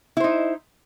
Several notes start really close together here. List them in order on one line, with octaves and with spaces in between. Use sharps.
E4 C5 D#4